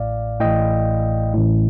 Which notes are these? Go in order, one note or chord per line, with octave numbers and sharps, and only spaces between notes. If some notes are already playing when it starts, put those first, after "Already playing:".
Already playing: A1 A2 D5 F5
A1 A2 D#5 G5
A1 A2